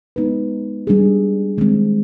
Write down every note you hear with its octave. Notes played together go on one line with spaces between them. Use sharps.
G#3 B3 D#4 B4
G3 D4 G#4
D#3 G#3 C4